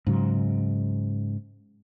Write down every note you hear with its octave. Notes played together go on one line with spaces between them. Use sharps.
G#2 C#3 F#3